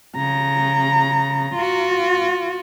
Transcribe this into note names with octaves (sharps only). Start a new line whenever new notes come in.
C#3 A#5
F4 F#4